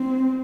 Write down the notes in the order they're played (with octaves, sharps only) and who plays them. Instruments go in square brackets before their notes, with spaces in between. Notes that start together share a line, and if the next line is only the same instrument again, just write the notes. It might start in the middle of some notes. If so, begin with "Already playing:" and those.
Already playing: [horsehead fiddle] C4